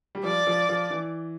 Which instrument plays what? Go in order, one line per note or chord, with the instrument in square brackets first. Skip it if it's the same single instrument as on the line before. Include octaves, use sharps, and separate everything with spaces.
[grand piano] G3
[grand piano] F3 [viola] D5
[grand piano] F3
F3
E3